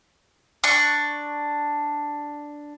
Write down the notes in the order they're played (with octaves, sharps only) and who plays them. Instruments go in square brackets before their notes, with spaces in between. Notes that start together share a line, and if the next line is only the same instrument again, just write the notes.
[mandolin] D4 C#6